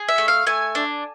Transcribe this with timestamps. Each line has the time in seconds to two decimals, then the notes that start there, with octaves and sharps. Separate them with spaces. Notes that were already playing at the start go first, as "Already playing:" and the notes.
Already playing: G#4
0.09 E5
0.18 A3
0.28 F5
0.47 A3 G#5
0.75 D4